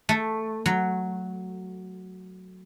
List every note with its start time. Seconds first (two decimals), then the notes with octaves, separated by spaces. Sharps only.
0.09 A3
0.66 F#3